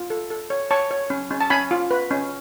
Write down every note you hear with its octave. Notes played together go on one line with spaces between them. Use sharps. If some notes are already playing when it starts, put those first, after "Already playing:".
Already playing: F4
A4
A4
C#5
C#5 A5 C#6
C#5
C#4
C#4
A5
C#4 G#5 B5
F4
B4
C#4